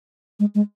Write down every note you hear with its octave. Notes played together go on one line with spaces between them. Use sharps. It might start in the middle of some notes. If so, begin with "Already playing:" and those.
G#3
G#3